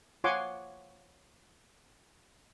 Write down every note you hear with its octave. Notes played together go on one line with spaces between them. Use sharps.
F4 C#5 F#5 G#5 C6 D6